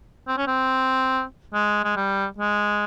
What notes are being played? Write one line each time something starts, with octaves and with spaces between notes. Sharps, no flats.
C4
C#4
C4
G#3
G#3
G3
G#3